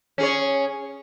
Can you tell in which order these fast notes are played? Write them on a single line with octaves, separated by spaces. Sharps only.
C#4 G#4 C#5